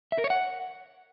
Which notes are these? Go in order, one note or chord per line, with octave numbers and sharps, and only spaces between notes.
E5
A#4
C#5
F#5